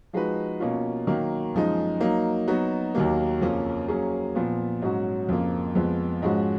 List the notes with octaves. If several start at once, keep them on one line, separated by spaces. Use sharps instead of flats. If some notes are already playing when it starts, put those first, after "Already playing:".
F3 G#3 D#4 F#4 B4
B2 A#3 C#4 F4
D#3 F#3 A#3
F#2 F3 G#3 D#4
F#3 A#3 D#4
F#3 B3 D#4 F#4
D#2 D#3 F#3 A#3
F2 C#3 F3 A#3 C#4
F#3 A#3 C#4 G#4
A#2 F3 B3
G#2 F#3 C#4 F#4
F2 C#3 F3 A#3
F2 F3 G#3 B3
G#2 F3 G#3 C#4 F#4